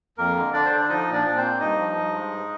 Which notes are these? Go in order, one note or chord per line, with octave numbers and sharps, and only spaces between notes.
F2 A#3 A#4
D3
D3 D4 D5
C5
D3
D5
F3 D#4 D#5
A#2
D4 D5
A#2
C4 C5
A#3
G2 D#4 D#5
F3
G2
G#3
G#2